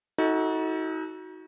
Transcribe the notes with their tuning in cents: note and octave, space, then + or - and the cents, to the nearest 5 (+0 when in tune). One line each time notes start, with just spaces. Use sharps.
D#4 +35 F#4 +0 A4 +0